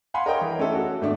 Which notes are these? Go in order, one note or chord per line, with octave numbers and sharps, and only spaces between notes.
F5 F#5 G#5 B5 C6
A#4 C#5 D#5 F#5 G5
E3
A3 C#4 E4 A4
F#4
G#1 A3 D4 D6